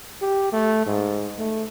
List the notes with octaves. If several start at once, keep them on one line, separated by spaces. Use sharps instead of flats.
G4
A3
G#2
A3